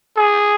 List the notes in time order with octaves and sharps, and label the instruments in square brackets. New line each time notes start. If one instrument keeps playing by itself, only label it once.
[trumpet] G#4